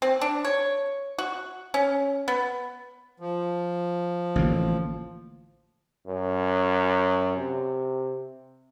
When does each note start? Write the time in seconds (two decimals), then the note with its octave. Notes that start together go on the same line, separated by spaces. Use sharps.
0.02 C4
0.21 D4
0.45 C#5
1.18 F#4
1.74 C#4
2.28 B3
3.20 F3
4.36 A1 D3 A#3
6.07 F#2
7.37 C3